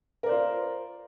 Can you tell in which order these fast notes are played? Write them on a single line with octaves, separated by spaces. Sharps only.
A#4 D5 C5 F4